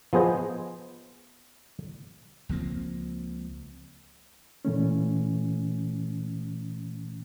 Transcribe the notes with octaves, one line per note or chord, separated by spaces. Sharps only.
F3 B3 G#4 C5 D#5
C#2 F3 A#3 C4
A#2 E3 A3 C#4